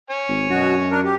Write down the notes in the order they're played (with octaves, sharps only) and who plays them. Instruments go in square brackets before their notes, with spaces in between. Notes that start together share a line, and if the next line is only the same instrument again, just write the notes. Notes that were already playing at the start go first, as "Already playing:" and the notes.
[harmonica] C#5 G#5
[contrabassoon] G#1
[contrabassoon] F#2 [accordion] B2 F#4
[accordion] D4 A#4
G4